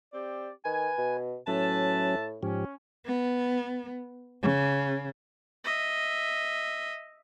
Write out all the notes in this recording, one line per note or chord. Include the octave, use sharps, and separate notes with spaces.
C4 G4 D5
D#3 B4 G#5
B2
A2 F#3 C#4 B4 E5 A5
G#2 F3 C#4 G4
B3
C#3
D#5 E5